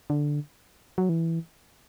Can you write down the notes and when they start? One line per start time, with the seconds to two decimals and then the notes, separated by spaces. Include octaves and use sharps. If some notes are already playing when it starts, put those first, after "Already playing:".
0.10 D3
0.98 F#3
1.09 E3